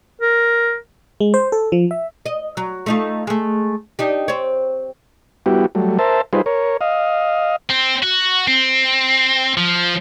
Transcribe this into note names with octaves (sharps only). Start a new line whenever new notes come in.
A#4
G#3
C5
A4
F3
E5
D#5
F#3
A3 D#4 F4
G#3 A3
D4 D#4 G4
C4 C#5
G3 B3 E4 F#4 G4
F#3 G3 A3
A#4 C5 E5 A5
G3 D#4 F4 G#4 B4 C5
A#4 C#5
D#5 F5
C4
F#4
C4
F3